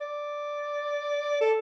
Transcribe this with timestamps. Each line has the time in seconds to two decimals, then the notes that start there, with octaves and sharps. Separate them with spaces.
0.01 D5
1.41 A4